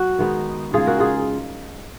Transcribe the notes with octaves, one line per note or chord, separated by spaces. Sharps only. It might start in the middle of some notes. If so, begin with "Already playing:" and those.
Already playing: F#3 F#4
D#3 G#3 B3 D#4
C#3 G#3 D#4 F4 G#4
F#4 A#4
F4 G#4